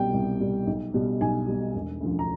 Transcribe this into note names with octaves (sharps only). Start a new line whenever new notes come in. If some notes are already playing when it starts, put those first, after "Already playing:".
Already playing: C2 B2 G3 G5
C2
B2 G3
B1
B2 G3
B1 G#5
B2 G3
E1
D2 C#3 F3
A#5